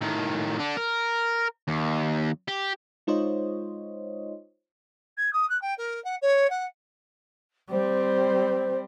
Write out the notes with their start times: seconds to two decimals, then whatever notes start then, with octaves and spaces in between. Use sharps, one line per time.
0.02 A2 D#3
0.58 D3 D4
0.77 A#4
1.68 D#2
2.48 G4
3.07 G#3 D#4 F4 C5 C#5 D#5
5.18 G#6
5.33 D#6
5.50 F#6
5.62 G5
5.78 A#4
6.05 F#5
6.22 C#5
6.50 F#5
7.71 G3 C4 C5